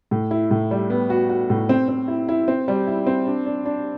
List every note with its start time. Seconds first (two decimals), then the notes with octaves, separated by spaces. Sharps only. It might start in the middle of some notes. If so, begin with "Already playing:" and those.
0.11 A2
0.31 E4
0.51 A2
0.71 G3
0.90 B3
1.10 F#4
1.30 F#4
1.50 A2
1.69 C4
1.89 C4
2.08 E4
2.29 E4
2.48 C4
2.68 G3
2.87 E4
3.07 C4
3.27 D4
3.46 D4
3.66 D4